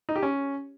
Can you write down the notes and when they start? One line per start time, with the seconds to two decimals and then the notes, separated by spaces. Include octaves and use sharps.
0.09 D#4
0.16 G4
0.23 C#4